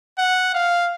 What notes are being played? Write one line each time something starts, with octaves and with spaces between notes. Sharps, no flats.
F#5
F5